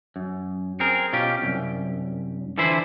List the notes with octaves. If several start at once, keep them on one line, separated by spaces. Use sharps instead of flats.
F#2
C4 G#4 A#4
B2 C#4 F4 G4
C2 F#2
D3 E3 F3 E4 B4 C5